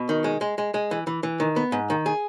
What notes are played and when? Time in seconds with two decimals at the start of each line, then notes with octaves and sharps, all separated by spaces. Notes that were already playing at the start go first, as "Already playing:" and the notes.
Already playing: B2
0.09 D#3
0.24 G#3
0.41 G#3
0.58 G#3
0.74 G#3
0.91 E3
1.07 E3
1.23 E3
1.40 D#3
1.56 B3
1.72 G#2
1.90 D#3
2.06 G#4